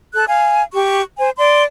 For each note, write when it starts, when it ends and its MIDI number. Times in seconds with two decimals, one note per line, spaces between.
0.13 0.25 69
0.13 0.25 90
0.28 0.62 77
0.28 0.62 80
0.73 1.00 67
0.73 1.00 85
1.18 1.29 72
1.18 1.29 80
1.37 1.64 74
1.37 1.64 84